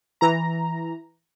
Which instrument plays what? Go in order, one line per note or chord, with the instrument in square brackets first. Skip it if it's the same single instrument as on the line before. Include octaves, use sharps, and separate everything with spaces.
[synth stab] E3 A#5